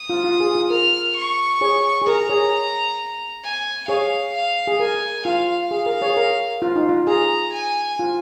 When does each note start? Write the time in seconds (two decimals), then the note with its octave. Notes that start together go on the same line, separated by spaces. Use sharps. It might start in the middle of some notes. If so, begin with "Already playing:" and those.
Already playing: D#6
0.09 F4
0.24 F4
0.40 G#4
0.55 F4
0.70 A#4 F6
1.16 C#6
1.61 G#4 C#5
2.02 G#4
2.07 A#4 A#5
2.29 G#4 C#5
3.44 G#5
3.88 G#4 C#5 F5
4.34 F5
4.67 G#4
4.80 A#4 G#5
5.25 F4 F5
5.71 G#4 F5
5.86 A#4
6.01 G#4 C#5
6.17 A#4
6.62 F4
6.76 D#4
6.89 F4
7.07 G#4 A#5
7.53 G#5
7.99 F4